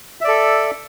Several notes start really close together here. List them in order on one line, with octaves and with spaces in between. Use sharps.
E5 D5 A4